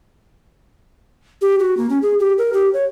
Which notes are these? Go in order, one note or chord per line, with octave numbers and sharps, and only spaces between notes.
G4
F#4
A#3
C#4
G#4
G4
A#4
G4
C#5